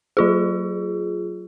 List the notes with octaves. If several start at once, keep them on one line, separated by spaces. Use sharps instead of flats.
F#3 F4 G#4